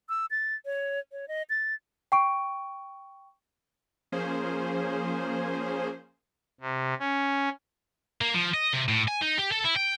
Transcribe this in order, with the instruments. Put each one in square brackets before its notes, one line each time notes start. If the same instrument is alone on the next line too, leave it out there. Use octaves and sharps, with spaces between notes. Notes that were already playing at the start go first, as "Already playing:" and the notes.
[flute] E6
A6
C#5
C#5
D#5
A6
[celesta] G5 C#6 D7
[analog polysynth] F3 A#3 C#4 G#4 C5
[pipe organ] C3
C#4
[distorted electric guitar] A#3
F3
D#5
C3
A2
G#5
D#4
G4
A4
E4
G5